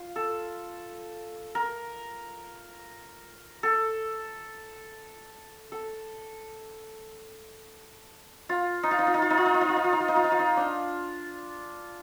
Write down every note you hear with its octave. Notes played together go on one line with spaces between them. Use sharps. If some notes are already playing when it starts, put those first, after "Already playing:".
Already playing: F4
A4
A#4
A4
A4
F4
D#4
F4
D#4
F4
D#4
F4
D#4
F4
D#4
F4
D#4
F4
D#4
F4
D#4
F4
D#4
F4
D#4
F4
D#4
D4